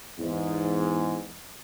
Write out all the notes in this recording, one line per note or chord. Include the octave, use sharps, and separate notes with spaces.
E2 G#2